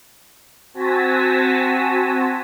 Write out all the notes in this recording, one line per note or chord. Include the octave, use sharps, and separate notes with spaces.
C4 F#4 G#5 A5 A#6 B6